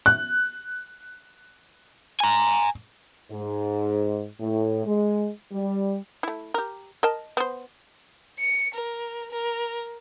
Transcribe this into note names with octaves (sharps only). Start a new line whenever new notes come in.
F#6
G#5 A#5
G#2
A2
G#3
G3
A3 E4
G4 A#4
A#4 D#5 A5
B3 C5
C#7
A#4
A#4